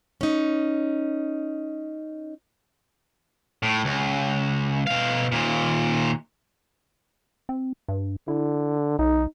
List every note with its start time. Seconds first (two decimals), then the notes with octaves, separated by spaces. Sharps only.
0.21 C#4 D#4
3.63 A2
3.85 C#2
4.87 B2 F5
5.32 D#2 A#2
7.49 C4
7.88 G2
8.28 D3 E4
8.99 B1 D#4